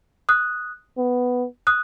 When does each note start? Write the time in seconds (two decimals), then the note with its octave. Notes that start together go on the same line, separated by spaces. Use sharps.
0.29 D#6 F#6
0.98 B3
1.67 D#6 F#6